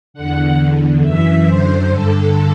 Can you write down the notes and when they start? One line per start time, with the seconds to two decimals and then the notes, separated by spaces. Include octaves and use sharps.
0.14 E2 D3 F#5
0.58 E2 D3
1.02 F#2 E3 E5
1.45 F#2 D3 C5
1.89 G2 D3 A4